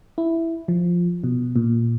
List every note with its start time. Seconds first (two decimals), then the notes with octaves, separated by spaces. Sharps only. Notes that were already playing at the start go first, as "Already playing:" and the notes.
0.18 E4
0.68 F3
1.24 B2
1.56 A#2